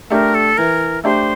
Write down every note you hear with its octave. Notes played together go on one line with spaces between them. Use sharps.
A3 D4 G4 A#4
A4
E3 A#4
A3 D4 G4 C5